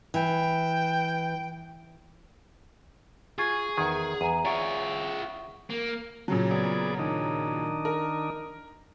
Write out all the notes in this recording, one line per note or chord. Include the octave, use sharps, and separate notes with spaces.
E3 G5
F4 G#4 G#5 C#6 G#6
E2 D#3 G#6
E2 G#5 A#5 D#7
F4 G#4 C#5 D5 E5 F#5 C#6
A#3
A#2 C#3 F#3
B3 G#4 D5
D#3 D4 D#4
A#4